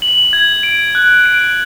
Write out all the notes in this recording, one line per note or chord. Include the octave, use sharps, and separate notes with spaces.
F#7
G#6
D7
F#6
D7